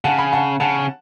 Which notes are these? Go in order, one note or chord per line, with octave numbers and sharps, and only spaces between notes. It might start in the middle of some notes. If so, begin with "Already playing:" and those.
C#3 F#5 A5
G#5 B5
F#5 A5
C#3 F#5 A5